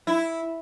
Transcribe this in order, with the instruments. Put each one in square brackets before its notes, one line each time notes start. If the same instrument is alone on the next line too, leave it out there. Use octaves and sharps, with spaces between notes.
[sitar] E4